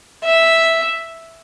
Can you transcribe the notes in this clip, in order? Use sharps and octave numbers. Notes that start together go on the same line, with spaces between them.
E5